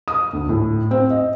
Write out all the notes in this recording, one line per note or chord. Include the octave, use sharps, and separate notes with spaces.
D#6
D2
A2
C4
D#5